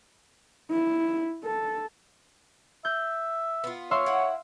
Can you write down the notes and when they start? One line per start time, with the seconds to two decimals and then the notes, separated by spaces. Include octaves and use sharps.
0.71 E4
1.44 A4
2.85 E5 G6
3.64 B3 F4
3.91 C#5 E5 F5 C6
4.06 E4 F#5